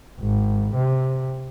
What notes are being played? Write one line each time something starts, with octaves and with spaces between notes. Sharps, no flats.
G#1
C3